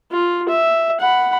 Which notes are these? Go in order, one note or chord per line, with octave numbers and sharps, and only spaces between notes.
F4
E5
F#5 B5